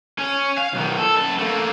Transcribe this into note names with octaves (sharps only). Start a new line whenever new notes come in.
C#4
F5
B1 D#3
A4
F#2 A5
A3 A#3